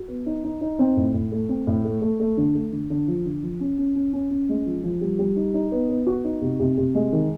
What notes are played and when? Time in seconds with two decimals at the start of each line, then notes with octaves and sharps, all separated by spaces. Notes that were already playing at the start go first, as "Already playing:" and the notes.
Already playing: F#4
0.08 B3
0.26 D#4
0.44 D#4
0.61 D#4
0.79 C4
0.96 A2
1.14 A2
1.32 A3
1.49 C4
1.67 A2
1.85 A3
2.02 A3
2.20 A3
2.37 D3
2.55 A3
2.72 D3
2.90 D3
3.08 F3
3.25 D3
3.43 F3
3.60 C#4
3.78 C#4
3.96 C#4
4.13 C#4
4.31 C#4
4.49 G#3
4.66 F3
4.84 F3
5.01 G3
5.19 G3
5.36 D#4
5.54 D#4
5.72 B3
5.89 B3
6.07 F#4
6.24 D#4
6.42 C3
6.60 C3
6.77 C3
6.95 G#3
7.13 D#3